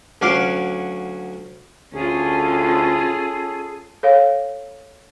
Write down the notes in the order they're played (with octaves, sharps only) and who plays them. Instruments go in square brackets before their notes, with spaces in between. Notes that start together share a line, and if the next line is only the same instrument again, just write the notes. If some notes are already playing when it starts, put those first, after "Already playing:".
[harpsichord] D2 F#3 C#4 F5 D6
[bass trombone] D2 [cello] C#4 F4 [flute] G#4 [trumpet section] A4
[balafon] A4 C#5 F5